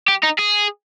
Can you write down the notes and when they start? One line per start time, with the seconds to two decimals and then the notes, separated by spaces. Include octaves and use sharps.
0.08 G4
0.23 D#4
0.39 G#4